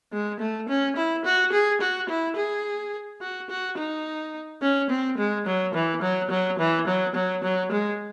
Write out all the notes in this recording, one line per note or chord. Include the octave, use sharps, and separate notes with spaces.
G#3
A3
C#4
E4
F#4
G#4
F#4
E4
G#4
F#4
F#4
D#4
C#4
C4
G#3
F#3
E3
F#3
F#3
E3
F#3
F#3
F#3
G#3